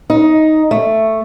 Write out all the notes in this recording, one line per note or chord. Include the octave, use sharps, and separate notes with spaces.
D#4
A3